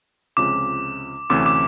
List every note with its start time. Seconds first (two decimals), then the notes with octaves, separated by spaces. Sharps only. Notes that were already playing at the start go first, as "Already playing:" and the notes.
0.37 C#2 C3 F3 G#3 C#4 D6
1.30 D2 C3 E3 A3 C#4 D6
1.46 D6